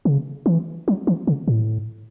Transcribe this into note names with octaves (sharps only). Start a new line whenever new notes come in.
C#3
E3
F#3
E3
C#3
A2